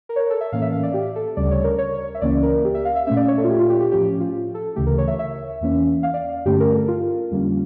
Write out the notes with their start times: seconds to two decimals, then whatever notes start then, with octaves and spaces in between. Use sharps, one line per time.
0.09 A#4
0.16 C#5
0.20 A#4
0.30 A4
0.41 E5
0.52 A2 E3 A#3 C#4 F5
0.62 E5
0.72 F5
0.83 D5
0.94 G4
1.16 A4
1.37 D2 C#3 G3 C#4 D5
1.51 C#5
1.64 A#4
1.78 C#5
2.15 E5
2.21 C#2 C#3 E3 A#3 C#4 D5
2.43 A#4
2.64 G4
2.74 E5
2.85 F5
2.95 E5
3.07 A#2 A3 C#4 E5
3.17 D5
3.28 C#5
3.38 A4
3.44 F4
3.49 G4
3.60 F4
3.69 G4
3.80 G4
3.91 A2 F3 C#4 G4
4.20 F4
4.54 A4
4.76 D2 C#3 E3 A3 G4
4.86 A#4
4.98 C#5
5.07 E5
5.19 E5
5.61 E2 E3 A#3 C#4
6.03 F5
6.14 D5
6.45 G2 D3 A3 C#4 G4
6.60 A#4
6.74 A4
6.88 F4
7.31 F2 D3 G3 A#3 C#4